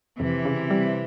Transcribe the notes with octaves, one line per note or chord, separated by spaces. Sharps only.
F2 C3 E3
C#3
G3